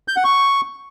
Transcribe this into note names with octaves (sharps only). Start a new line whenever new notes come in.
G6
F#5
C#6